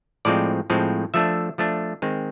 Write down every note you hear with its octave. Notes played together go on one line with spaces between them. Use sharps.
A2 F3 G#3 C4 D5
A2 F3 G#3 C4
F3 A3 D4 E5
F3 A3 D4
D#3 G#3 C4